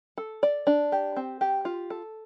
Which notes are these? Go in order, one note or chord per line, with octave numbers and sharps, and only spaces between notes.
A4
D5
D4
G4
C4
G4
F4
A4